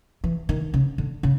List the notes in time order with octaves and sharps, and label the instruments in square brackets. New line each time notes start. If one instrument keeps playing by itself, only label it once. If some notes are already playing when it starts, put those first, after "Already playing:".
[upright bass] E3
D#3
C#3
D3
C#3